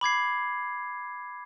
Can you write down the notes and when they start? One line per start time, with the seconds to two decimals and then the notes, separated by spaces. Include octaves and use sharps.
0.01 B5 D6 G#6 C7